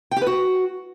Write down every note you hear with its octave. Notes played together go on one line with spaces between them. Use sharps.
G5
G4
B4
F#4